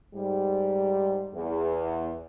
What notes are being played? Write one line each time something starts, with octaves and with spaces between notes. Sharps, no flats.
G#2 G3
E2